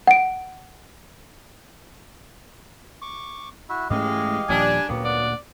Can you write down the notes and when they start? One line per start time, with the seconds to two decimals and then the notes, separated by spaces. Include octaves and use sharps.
0.07 F#5 D7
3.02 C#6 D6
3.69 E4 F#4 E5
3.90 G#2 E3 G#3 A3 C#4 G4 D#5 F5
4.49 D#1 A#2 F3 G3 D4 G#5
4.89 D2 A#2 F#3 A#3 B3 G4
5.04 D5 F#5